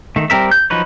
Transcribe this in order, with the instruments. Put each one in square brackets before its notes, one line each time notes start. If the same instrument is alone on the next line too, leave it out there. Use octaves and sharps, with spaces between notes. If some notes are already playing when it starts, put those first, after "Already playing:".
[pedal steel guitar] D#3 A3
G3 C4 A#4 E5
G6
F3 F#3 D#4 B4 C#5